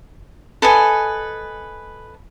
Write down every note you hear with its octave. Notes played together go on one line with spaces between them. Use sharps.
A4 B4 D#5 G#5